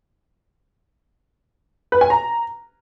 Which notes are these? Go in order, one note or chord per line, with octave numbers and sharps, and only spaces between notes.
B4
G#5
A#5